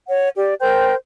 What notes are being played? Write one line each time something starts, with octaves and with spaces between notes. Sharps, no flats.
C#5 F#5
G4 D5
A#4 C5 G5 G6